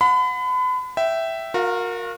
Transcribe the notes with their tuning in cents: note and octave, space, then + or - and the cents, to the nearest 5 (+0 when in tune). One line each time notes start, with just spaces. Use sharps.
F#5 -35 B5 +35
E5 +0 G5 -20
F#4 -40 A#4 -5 F5 +0